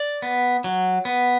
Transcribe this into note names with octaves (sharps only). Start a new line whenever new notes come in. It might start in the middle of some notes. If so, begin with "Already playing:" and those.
Already playing: D5
B3
F#3
B3